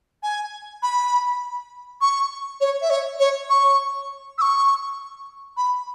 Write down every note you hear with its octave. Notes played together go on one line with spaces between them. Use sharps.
G#5
B5
C#6
C#5
E5
C#5
C#5
C#6
E6
C#6
B5